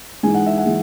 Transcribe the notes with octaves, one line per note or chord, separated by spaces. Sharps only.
G#2 E3 G#3 G#5
F#5
E5
F#5
E3 G#3